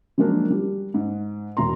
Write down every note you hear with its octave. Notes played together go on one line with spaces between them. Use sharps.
F3 F#3 G#3 A#3 D4
G3
G#2
E1 B2 A#5 C6